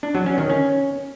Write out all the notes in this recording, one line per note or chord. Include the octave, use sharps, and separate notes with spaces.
D4
F#3
C#4
D#3
C#4